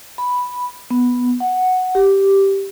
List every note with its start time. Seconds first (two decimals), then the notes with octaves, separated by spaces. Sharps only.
0.18 B5
0.91 B3
1.40 F#5
1.95 G4